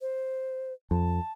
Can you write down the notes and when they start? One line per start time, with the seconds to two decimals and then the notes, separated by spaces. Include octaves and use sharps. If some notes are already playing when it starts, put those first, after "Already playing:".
0.01 C5
0.91 F2 A5